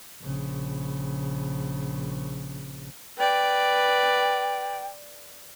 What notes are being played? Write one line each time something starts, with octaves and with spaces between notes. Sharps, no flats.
A#1 C#3
B4 D5 G5